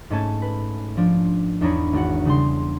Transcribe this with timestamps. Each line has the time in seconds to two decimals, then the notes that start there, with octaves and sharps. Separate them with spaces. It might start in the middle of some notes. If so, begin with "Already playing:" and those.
0.10 G#2 A3 C#4 G#5 A5 G#6
0.42 B4
0.97 F3 D4
1.61 E2 D4 D#4 C#5 B5
1.93 G#1 D4 F#4 F#5
2.25 C#3 G3 D4 C6